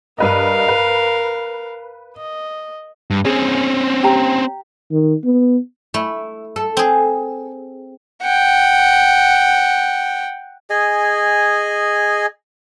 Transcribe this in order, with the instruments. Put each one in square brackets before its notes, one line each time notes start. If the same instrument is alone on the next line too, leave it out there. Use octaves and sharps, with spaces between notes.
[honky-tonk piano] G2 B4 D#5 [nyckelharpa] A#4 F5
[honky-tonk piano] B4
[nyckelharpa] D#5
[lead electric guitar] G2
[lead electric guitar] C4 C#4 [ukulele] G#4
[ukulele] G4 A#5
[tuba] D#3
B3
[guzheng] A3 [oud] E4
[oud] A4
[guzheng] C4 G#4
[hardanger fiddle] F#5 G5
[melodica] G#4 D#5 G#5